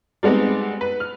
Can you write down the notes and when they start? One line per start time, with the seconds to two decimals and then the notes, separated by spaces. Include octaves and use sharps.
0.23 G3 G#3 B3 C4 D#4
0.81 B4
1.00 F6